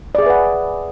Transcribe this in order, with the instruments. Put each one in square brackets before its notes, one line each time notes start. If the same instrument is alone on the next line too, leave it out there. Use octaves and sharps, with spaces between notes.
[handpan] D5
G#4
E5
B4
F#5